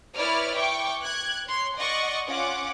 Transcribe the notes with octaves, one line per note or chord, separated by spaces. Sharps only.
E4 B4 C#5 D5 F6
G5 C#6 D6
F#6 G#6
C#5 C6
D5 D#5 F#5 C#6
C#4 F4 F#5 D6